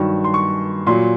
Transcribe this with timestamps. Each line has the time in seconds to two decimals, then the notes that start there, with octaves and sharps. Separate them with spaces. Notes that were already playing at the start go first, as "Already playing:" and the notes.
Already playing: G2 D#3 F#3 C#6
0.24 C6
0.34 C#6
0.87 A#2 F#3 C6